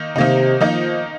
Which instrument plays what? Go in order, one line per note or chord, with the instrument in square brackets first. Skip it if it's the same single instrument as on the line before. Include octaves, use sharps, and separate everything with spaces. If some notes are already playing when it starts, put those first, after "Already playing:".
Already playing: [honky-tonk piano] D#3 A#3 D#4
[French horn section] C3 [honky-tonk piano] D#3 A#3 D#4
[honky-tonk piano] D#3 A#3 D#4 [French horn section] F3